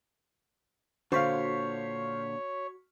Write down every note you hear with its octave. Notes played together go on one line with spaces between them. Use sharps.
A#2 D3 F#4 C5 C#5 F5 C#6 B6